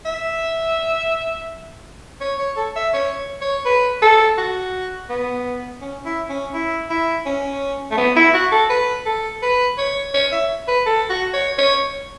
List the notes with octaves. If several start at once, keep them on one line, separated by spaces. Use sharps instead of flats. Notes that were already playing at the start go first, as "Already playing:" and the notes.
E5
C#5
C#5
A4
E5
C#5
C#5
B4
A4
F#4
B3
C#4
E4
C#4
E4
E4
C#4
A3
B3
E4
F#4
A4
B4
A4
B4
C#5
C#5
E5
B4
A4
F#4
C#5
C#5